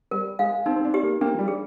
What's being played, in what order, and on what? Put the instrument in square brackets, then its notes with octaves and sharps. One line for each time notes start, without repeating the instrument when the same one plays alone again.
[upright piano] G3 [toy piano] A#4
[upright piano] G#3 [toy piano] F5
[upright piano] C4 [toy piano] D#4
[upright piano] C4
D4
[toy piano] G4
[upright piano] A#3
[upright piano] A#3 [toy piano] D4
[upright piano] F3
G3
[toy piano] G#4